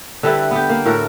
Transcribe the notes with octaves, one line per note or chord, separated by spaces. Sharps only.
D3 G3 E4 B4
B3 G4
A#3
A2 F#4 A4 A#4